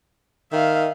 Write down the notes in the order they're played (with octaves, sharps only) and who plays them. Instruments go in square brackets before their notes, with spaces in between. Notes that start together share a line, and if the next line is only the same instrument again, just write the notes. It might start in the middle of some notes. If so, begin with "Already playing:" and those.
[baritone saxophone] D#3 [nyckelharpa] E5 F5